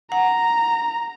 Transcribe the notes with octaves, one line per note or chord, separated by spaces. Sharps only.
F#5 A#5